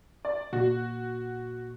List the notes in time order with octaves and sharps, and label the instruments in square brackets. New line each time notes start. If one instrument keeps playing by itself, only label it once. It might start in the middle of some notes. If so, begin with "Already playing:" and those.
[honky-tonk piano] D5
[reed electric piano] A#2 [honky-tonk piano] F#4